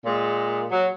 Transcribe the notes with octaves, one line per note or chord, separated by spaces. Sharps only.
A#2 G#3
F#3